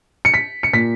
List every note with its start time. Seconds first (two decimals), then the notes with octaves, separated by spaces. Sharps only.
0.25 C#7
0.34 B6
0.63 C#7
0.73 A#2 B6